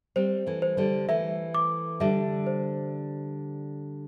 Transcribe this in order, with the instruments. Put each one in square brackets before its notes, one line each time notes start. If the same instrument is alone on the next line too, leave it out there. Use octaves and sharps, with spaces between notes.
[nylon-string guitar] G3 C4 [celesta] C5
[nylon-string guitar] E3 A3
[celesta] C5
[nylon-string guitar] D3 G3
[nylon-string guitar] E3 A3 [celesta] E5
[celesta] D6
[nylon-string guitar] D3 G3 [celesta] E5
[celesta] C5